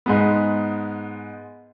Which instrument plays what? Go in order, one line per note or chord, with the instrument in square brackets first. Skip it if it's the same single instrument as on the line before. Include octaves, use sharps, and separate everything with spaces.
[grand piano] G#2 G#3 B3